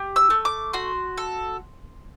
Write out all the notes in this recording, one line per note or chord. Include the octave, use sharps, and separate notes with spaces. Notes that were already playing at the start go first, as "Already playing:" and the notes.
Already playing: G4
E6
A3
D6
F#4 C6
A4